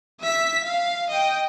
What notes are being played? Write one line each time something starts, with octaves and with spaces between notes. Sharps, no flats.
E5 B6
F5
D#5 G5